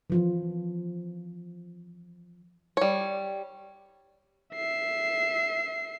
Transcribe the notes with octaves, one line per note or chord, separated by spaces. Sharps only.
E3 F3 F4
G3 C#5
E5 C7